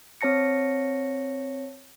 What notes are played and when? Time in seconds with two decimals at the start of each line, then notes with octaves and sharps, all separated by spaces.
0.21 C4 C#5 A5 A#6 C#7